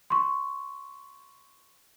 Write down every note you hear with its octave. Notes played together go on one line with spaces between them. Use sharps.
C6 C#6